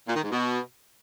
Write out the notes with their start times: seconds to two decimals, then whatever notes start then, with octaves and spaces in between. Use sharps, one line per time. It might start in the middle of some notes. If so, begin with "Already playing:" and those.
0.08 A#2
0.16 D#3
0.24 G#2
0.32 B2